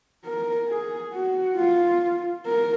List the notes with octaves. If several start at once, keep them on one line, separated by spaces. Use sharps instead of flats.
A#4
G#4
F#4
F4
A#4